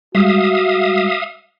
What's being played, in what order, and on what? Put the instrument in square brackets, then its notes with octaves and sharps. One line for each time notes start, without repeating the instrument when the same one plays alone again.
[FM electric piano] G3 G#3 [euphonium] F#4 [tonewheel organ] E5 F5 D#6